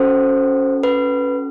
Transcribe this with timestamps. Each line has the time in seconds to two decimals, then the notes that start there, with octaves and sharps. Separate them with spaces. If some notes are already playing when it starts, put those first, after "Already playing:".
Already playing: C#4 F#4 A4 C5
0.83 B4